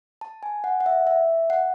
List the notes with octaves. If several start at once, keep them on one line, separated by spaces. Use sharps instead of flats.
A5
G#5
F#5
F#5
E5
E5
F#5